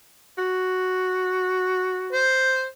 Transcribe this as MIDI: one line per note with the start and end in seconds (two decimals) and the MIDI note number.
0.38 2.27 66
2.13 2.65 72